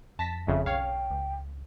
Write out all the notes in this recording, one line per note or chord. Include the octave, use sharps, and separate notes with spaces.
F2 A5 A#6 B6
F#1 F2 C#3 E5
B1 C#5 F5 G5
C#2